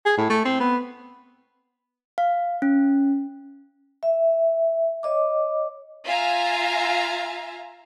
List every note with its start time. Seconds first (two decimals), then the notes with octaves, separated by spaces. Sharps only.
0.05 G#4
0.18 A2
0.30 A3
0.45 C4
0.60 B3
2.18 F5
2.62 C#4
4.03 E5
5.03 C#5 D#5 D6
6.05 F4 E5 F5 G#5 A#5